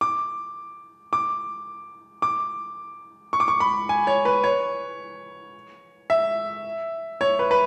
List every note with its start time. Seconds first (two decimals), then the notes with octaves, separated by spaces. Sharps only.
0.01 D6
1.13 D6
2.22 D6
3.33 C#6
3.40 D6
3.48 C#6
3.60 B5
3.89 G#5
4.07 C#5
4.25 B4
4.44 C#5
6.10 E5
7.21 C#5
7.39 B4
7.51 B4